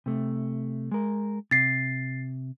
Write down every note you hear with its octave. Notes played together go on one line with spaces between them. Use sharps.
C3 A3
G#3 A#4
C3 A6 C7